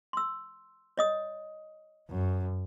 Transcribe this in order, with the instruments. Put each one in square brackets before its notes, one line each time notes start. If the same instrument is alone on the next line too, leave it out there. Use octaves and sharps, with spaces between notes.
[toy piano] C6 E6
C#5 D#5 D#6
[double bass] F#2